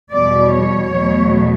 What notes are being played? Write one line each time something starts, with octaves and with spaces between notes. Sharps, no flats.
E2 B2 G3 D5
C#5
E2 B2 F#3 A3